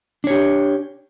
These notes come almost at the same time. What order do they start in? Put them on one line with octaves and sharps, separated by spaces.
D4 C#5 G4